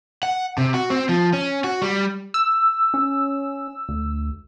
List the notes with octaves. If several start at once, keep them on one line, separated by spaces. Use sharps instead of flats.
F#5
C3
F#4
C4
F3
C#4
F#4
G3
E6
C#4
D2